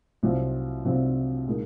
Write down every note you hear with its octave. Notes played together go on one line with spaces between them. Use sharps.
C2 C3 F#3 C4 F4
C2 C3 F#3 C4 F4
A#2 G#3 D#4 A#4